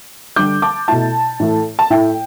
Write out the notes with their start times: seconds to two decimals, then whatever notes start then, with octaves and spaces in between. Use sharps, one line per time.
0.36 D3 G3 D4 D6 G6
0.62 A5 D6
0.88 B2 A3 E4 A5
1.40 A2 E3 A3
1.79 A5
1.90 A2 A3 E4 G5